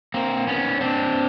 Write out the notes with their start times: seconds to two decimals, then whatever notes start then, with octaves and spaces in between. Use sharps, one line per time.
0.14 A#3 C4
0.47 B3 C#4
0.81 C4 D4